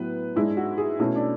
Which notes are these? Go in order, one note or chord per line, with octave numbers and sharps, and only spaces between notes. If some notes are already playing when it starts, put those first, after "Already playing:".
Already playing: A2 F#3 B3 B4
G#2 G#3 D4 E4
F#4
G#4
B2 A3 C#4 E4
D4